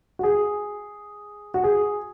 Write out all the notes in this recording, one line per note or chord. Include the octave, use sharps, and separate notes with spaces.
F#4
G#4
F#4
G#4